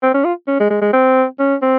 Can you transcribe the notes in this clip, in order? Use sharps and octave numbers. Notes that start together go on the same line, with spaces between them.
C4
C#4
F4
C#4
G#3
G#3
G#3
C4
C#4
C4